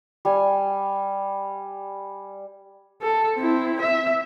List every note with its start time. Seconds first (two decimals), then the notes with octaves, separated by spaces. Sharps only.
0.25 G3 G#5
3.02 A4
3.37 C4 E4
3.82 E5